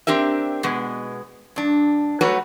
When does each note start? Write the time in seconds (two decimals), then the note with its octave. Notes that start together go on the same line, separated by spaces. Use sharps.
0.07 C4 D4 G4 A#4 E5
0.63 B2 G#3 B3
1.56 G2 D4
2.21 F#3 G3 A3 F#4 B4 C#5